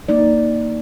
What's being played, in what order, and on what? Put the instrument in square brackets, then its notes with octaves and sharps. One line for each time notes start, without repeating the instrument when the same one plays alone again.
[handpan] A#3 D#4 D5